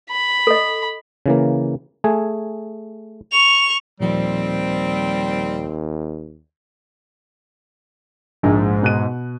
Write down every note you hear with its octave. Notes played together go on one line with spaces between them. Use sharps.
B5
A4 D#5
C#3 E3 A#3
A3 G#4 G#5
C#6 F7
D#2 A#2 F3 G3 C4
A#1 G#2
B2 F#6 D#7